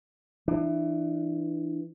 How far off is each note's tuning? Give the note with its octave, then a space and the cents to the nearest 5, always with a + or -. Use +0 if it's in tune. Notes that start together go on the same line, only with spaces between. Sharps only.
E3 +10 D4 +35